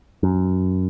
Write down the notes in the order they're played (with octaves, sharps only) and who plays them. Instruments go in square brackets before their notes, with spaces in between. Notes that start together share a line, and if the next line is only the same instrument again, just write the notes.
[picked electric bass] F#2